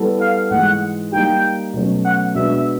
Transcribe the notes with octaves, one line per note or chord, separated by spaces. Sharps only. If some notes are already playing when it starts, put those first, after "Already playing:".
Already playing: G3 B3 E4 A4
F5
G#2 E3 G#3 F#5
G3 A#3 D#4 G4 G5
B2 F#3 A3 C#4
F#5
B2 G#3 B3 D4 F#4 E5